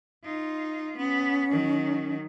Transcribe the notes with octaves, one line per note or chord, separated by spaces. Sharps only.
D#4 F4
B3 C#4
D#3 F#3